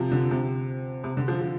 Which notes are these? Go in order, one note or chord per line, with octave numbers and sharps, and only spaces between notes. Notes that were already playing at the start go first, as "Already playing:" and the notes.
Already playing: C3 F3
D3
C3
C3
D3
F3
F3